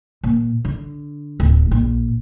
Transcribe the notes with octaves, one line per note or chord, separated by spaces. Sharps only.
A#2
D3
D1
A#1